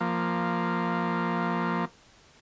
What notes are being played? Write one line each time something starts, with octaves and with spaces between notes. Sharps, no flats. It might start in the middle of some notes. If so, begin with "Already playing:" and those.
F3 A#3